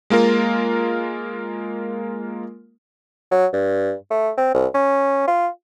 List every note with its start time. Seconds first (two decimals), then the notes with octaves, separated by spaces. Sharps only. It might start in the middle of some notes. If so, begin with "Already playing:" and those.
0.10 G#3 A#3 F4 A#4
3.32 F#3
3.53 G2
4.10 A3
4.38 C4
4.54 C2
4.74 C#4
5.28 F4